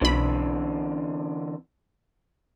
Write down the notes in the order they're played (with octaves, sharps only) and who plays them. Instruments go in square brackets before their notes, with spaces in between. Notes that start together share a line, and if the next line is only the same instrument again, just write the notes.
[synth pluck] B1 B5 [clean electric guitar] D3 E3 C4